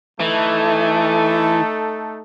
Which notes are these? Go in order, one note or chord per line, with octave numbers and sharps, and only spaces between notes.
E3 A3 D#4 A4